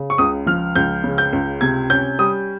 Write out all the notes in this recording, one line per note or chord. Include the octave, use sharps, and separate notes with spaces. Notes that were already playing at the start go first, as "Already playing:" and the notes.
Already playing: C#3
C#6
C#2 D#6
F3 F6
C#2 G6
C#3
G6
C#2
C3 G#6
C#4 G6
G3 D#6